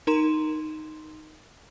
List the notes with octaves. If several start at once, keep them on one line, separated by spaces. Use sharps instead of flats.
D#4 A#4 A#5 C6 E7